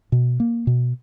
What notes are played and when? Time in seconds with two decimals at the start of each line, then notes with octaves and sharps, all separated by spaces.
0.12 B2
0.40 A#3
0.67 B2